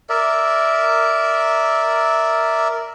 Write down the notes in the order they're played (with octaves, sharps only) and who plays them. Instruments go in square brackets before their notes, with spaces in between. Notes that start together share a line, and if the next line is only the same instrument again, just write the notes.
[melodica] A#4 D5 E5